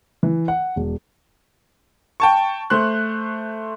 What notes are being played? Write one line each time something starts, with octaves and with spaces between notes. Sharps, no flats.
E3
F#5
E1
G5 A5 C#6
A3 C5 C6 F#6